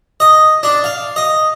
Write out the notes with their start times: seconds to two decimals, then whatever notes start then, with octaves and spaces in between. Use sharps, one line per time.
0.20 D#5
0.63 D4
0.84 F5
1.16 D#5